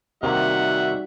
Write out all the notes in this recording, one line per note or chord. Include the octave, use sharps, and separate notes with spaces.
C3 D#3 G3 A#3 D#4 F#4 E5 F#5